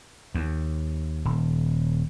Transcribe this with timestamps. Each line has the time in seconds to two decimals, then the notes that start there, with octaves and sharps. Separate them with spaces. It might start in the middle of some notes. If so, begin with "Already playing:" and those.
0.34 D#2
1.25 D#1